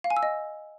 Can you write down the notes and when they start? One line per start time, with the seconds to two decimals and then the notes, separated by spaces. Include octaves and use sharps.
0.04 F5
0.10 G#5
0.17 E6
0.23 D#5